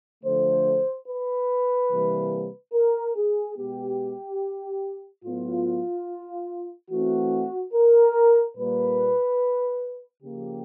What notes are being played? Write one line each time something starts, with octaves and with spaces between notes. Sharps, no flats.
D3 F3 A3 C5
B4
C3 E3 G3 A#3
A#4
G#4
B2 G#3 B3 G4
A2 F#3 B3 F4
E3 A3 C4 F#4
A#4
A#2 G3 A#3 B4
C#3 F3 A#3 G4